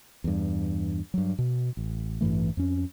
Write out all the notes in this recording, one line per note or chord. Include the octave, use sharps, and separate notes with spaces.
E2 G2
G2 F#3
B2
A1
A1 G2 E3 A3
F2 C#4